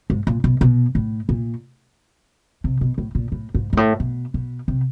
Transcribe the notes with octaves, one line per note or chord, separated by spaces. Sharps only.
G#2
A#2
B2
B2
A2
A#2
C3
B2
A2
A#2
A2
G#2
G#2
A2
B2
B2
C3